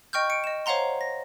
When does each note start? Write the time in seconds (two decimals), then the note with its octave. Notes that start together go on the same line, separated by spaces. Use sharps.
0.13 D#5 G5 C#6 F6 G6
0.30 C#7 D7
0.44 D#5 E7
0.66 C5 C#5 F5 F#5 A#5 C6
1.01 A#6